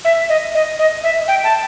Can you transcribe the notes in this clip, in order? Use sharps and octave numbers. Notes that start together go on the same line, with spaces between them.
E5
D#5
D#5
D#5
E5
G5
A5